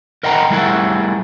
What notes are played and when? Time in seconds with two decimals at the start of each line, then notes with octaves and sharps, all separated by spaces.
0.23 A#4 D#5 F#5 G5 A#5
0.50 G3 A3 E4 G#4 A#4 F#5